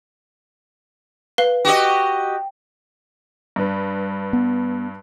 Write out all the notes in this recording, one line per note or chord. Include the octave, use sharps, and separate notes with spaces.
B4 F5 G7
F#4 G4 D#5 G5
G2 B4
B3